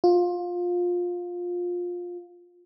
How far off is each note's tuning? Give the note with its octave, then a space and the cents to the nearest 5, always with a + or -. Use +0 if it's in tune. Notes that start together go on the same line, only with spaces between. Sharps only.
F4 +20